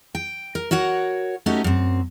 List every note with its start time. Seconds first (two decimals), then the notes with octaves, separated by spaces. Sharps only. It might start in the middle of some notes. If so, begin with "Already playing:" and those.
0.15 G5
0.55 A#4
0.71 F#4 A#4 C#5 F#5
1.46 A3 C#4 D#4 F#4 G4
1.64 F#2 C4